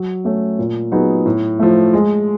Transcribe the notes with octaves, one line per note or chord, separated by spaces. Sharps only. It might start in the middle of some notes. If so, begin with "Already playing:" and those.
Already playing: F#3
A3 C#4
A#2
F#3 B3 D#4 G#4
A2
F3 A3
G#3